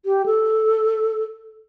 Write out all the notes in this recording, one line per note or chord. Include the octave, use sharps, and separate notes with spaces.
G4
A4